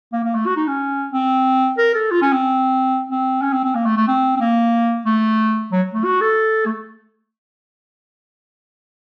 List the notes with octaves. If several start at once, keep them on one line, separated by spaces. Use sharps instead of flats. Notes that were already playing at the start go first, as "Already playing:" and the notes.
A#3
A#3
A3
F#4
D#4
C#4
C4
A#4
A4
F4
C#4
C4
C4
C#4
C4
C4
A#3
A3
A3
C4
C4
A#3
A3
F#3
A3
F#4
A4
A3